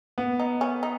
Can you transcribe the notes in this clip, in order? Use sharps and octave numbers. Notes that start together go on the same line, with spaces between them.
B3
D#4
C#4
D#4